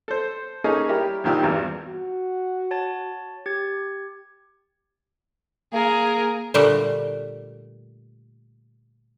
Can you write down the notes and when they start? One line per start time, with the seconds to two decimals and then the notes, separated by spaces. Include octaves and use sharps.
0.08 A4 C5
0.64 A#3 C#4 D#4 G#4 A4
0.89 G3 E4 G4 A#4
1.24 A#1 A#2 D#3 G4 D5 E6
1.43 G#1 E2 G2
1.87 F#4
2.71 C#5 A5 A6
3.46 G4 G#6
5.73 A#3 G#4 A#4
6.54 A#2 D3 G3 A3 F#4 G4